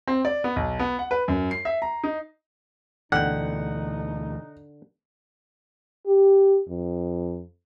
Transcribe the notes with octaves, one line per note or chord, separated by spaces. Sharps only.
C4
D5
B3
B1
B3
F#5
B4
F#2
C7
E5
A#5
D#4
D2 B2 D3 E3 D#4 F#5 G5
G4
F2